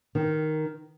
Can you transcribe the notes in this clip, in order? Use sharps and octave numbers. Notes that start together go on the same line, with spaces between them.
D#3